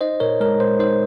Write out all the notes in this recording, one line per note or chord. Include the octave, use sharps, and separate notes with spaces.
D#4 C5 D#5
A#2 A#4 C#5
G#3 A#4
A#2 C5
D#4 C5